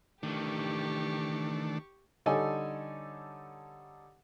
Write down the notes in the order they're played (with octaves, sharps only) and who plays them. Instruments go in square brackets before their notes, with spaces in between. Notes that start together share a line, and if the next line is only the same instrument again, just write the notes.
[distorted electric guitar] D#3 E3 [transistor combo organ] A3 D4 [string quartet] G4 C#6
[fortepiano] D3 G3 D#4 A4 C#5 G#5